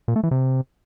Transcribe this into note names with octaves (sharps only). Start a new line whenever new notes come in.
A#2
A3
E3
C3